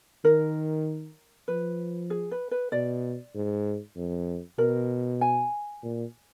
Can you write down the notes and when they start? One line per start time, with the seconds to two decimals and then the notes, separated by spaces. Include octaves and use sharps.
0.24 D#3 A#4
1.48 F3 B4
2.10 G#4
2.31 B4
2.51 B4
2.72 B2 D5
3.35 G#2
3.97 F2
4.58 B2 A#4
5.21 G#5
5.83 A#2